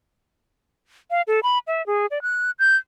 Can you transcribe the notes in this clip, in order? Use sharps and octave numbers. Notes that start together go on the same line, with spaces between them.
F5
A4
B5
E5
G#4
D5
F#6
G6